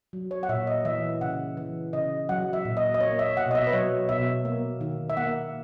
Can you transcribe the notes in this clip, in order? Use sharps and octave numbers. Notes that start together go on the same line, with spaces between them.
F#3
C#5
F#5
A#2 E5
D#5
E3 E5
C#3 F#5
E3
C#3 D#5
F#3 F#5
E5
A#2
D#5
D#5
A#3 C#5
E5
B2 F#5
D#5
E5
B4
F#3 C#5
B2 E5
A#3
D#3
E5
A#3 F#5